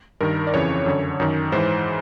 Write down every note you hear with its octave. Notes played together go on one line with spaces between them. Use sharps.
G2 D#3 A#4
D5
F2 C#3 E3 C#5
F#2 D3
F#2 D#3
G#2 E3 C5